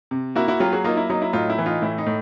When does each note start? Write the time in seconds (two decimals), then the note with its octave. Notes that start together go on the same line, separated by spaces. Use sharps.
0.11 C3
0.35 A#3 E4 F#4
0.48 E4 F#4
0.60 F#3 F4 G4
0.73 F#4 G#4
0.84 A#3 D#4 F4
0.97 E4
1.10 F#3 D#4
1.22 E4
1.33 A2 D#4 F4
1.50 E4
1.58 E3
1.66 D#4 F4
1.82 A2 E4
1.98 D#4
2.06 A2